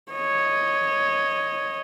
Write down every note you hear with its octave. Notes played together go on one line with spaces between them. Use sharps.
C#5 D#5